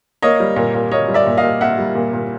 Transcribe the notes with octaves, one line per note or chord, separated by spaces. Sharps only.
A#3 C#5 D#5
G3
A#2
A#2
A#3 C#5 D#5
G3
D5 E5
A#2
D#5 F5
A#2
A#3 E5 F#5
G3
A#2
A#2